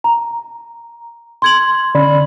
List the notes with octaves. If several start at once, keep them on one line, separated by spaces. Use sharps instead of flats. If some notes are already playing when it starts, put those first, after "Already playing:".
A#5
C6 G#6 F#7
D3 C#4 D5 B5